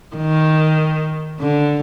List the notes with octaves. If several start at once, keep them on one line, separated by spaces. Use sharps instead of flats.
D#3
D3